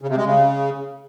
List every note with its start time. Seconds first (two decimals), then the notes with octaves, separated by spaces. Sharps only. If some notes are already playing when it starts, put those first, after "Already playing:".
0.01 C#3
0.09 C3
0.17 G#3
0.25 C#3